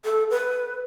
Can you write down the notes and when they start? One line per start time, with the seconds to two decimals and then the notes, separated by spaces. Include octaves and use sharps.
0.05 A4
0.30 B4